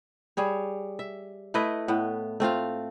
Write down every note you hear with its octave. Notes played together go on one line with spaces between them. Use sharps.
G3 G#4 C#5
E5
A3 E4 B4 D#5
A2 B3
A3 C4 F4 F5